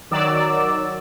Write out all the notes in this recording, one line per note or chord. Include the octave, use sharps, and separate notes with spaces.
D#3 F#3 D5 E6